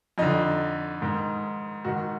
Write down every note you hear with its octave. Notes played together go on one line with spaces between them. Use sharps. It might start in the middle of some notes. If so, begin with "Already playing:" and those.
F2 D3 D#4
G#2 D#3
G#2 D#3 F#4